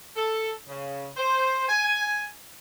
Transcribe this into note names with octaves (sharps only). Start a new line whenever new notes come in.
A4
C#3
C5
G#5